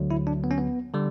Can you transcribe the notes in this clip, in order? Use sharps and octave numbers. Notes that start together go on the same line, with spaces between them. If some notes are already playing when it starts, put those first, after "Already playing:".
Already playing: D2 D3 F#3
E4
D4
B3
C#4
B3
D3 G3